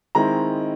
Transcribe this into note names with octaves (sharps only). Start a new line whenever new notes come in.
D#3 G#3 C4 E4 A#5